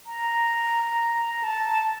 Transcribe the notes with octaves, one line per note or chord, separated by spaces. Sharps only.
A#5
A5